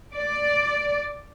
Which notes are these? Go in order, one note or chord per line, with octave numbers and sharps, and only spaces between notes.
D5